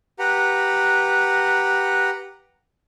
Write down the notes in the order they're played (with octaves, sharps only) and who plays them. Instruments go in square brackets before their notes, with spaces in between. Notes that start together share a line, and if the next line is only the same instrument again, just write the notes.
[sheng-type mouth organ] G4 B4 F#5 A#5